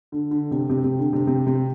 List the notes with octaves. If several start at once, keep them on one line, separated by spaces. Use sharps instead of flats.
D3
D3
C3
C3
C3
D3
C3
C3
C3